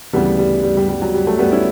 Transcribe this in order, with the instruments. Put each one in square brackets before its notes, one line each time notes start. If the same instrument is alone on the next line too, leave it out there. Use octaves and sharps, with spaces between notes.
[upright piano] D2 C#3 E3 G3 B3
G3
G3
G3
G3
F#3
G3
F#3 A3
G3 B3
C#4 E4